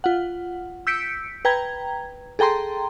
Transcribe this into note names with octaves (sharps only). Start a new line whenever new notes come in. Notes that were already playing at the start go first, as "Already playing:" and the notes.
F4 F#5
E6 G6 B6 C#7 D7
B4 G5 A#5 G#6
G#4 A4 G5 A#5 C6